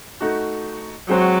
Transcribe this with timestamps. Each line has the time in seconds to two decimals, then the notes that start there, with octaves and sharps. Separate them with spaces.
0.21 A3 D#4 F#4
1.09 F#3 G#3 C4 F#4 C5